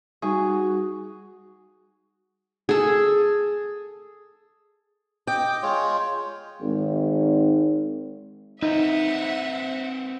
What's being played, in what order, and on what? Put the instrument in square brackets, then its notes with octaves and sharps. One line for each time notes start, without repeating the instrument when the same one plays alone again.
[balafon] G3 D#4 C#6 [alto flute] F#4 [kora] G#4
[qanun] G#4 A4
[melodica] D#5 D6 [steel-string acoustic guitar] G5
[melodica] G#3 F4 C#5
[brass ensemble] G#1
[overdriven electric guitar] C4 B4 [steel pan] D#4 [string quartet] E5 F#5